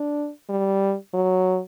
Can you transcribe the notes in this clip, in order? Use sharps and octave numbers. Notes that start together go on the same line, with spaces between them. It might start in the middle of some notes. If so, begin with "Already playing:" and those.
Already playing: D4
G3
F#3